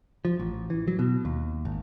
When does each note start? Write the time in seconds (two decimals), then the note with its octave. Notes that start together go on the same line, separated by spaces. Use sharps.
0.25 F3
0.39 A1
0.70 E3
0.88 F#3
0.99 B2
1.25 D#2
1.65 G#1